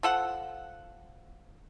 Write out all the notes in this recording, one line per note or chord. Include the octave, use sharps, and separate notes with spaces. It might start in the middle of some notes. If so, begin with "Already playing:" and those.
F3 A4 F#5